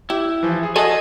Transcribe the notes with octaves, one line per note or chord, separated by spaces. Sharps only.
E4 G4
E3 F3
G#4
F#4 G#4 A4 D#5 F#5 G#5